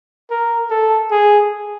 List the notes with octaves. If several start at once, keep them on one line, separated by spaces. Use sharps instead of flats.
A#4
A4
G#4